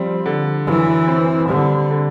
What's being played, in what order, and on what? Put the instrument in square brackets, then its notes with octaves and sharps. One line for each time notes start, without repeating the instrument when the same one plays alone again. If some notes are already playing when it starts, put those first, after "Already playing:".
Already playing: [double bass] F3 [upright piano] G3 C4
[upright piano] D3
[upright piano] F#2 [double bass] E3
[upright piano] C4
[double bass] D3 [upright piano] G3
[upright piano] D3